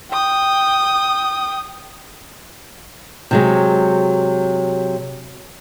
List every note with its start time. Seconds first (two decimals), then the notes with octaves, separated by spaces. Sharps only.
0.11 G5 D#6
3.31 C3 F#3 G#3